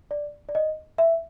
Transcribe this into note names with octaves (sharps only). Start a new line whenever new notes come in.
D5
D5
D#5
E5